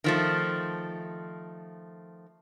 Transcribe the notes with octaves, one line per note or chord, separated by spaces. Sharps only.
D#3 F3 A3